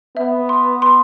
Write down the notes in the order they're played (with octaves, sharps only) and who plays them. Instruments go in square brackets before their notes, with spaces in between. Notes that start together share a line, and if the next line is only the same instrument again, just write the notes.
[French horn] B3 [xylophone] E5
[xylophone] C6
C6